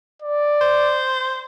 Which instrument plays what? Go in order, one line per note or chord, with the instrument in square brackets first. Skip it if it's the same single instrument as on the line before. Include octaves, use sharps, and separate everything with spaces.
[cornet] D5
[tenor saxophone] C5